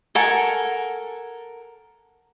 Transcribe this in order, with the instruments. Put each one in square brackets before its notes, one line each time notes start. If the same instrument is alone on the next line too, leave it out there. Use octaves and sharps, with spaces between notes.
[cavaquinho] A4 A#4 F#5 G#5